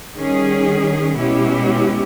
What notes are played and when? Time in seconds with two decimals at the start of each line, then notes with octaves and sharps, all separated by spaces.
0.16 D#3 G3 C#4 G#4
1.15 B2 G#3 C#4 E4 G4